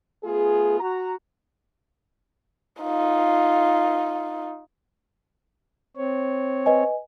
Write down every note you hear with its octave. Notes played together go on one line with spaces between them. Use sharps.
A3 B3 F4 G#4
F#4 A#5
D#4 F4
C4 C#5
B4 D#5 G#5